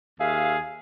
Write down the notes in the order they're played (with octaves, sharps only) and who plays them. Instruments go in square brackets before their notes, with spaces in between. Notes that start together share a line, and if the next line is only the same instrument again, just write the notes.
[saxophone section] D#2 E5 F5 [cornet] G#4